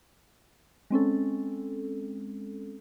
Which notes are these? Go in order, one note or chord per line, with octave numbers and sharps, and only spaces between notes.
G#3 C4 C#4 A4